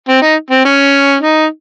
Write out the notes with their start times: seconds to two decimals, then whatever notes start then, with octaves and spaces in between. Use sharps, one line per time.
0.09 C4
0.22 D#4
0.51 C4
0.65 C#4
1.21 D#4